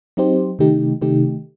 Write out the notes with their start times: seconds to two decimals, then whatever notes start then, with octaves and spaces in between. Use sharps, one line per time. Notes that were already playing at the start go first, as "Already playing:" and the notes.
0.17 F#3 C4 D#4 G4 C5
0.59 C3 D#3 A3 D#4 G4
1.02 C3 D#3 A3 D#4 G4